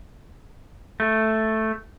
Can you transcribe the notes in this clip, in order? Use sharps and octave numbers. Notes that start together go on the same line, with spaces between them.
A3